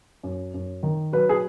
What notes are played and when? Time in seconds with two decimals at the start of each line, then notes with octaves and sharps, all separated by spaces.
0.23 F#2
0.54 F#2
0.83 D#3
1.13 F#3 B4
1.29 G#4